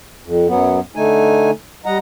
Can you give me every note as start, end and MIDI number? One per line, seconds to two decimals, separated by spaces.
0.23 0.47 41
0.48 0.80 42
0.48 0.80 54
0.48 0.80 59
0.95 1.51 50
0.95 1.51 57
0.95 1.51 63
0.95 1.51 80
1.86 1.98 55
1.86 1.98 75
1.86 1.98 78
1.86 1.98 82